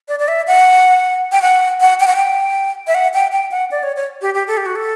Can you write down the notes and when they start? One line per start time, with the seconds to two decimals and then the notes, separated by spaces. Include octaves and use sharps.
0.08 D5
0.19 D5
0.28 E5
0.47 F#5
1.32 G5
1.42 F#5
1.81 F#5
2.00 G5
2.07 F#5
2.16 G5
2.87 E5
2.94 F#5
3.14 G5
3.32 G5
3.51 F#5
3.71 D5
3.83 C#5
3.96 C#5
4.22 G4
4.34 G4
4.47 A4
4.57 G4
4.66 F#4
4.75 A4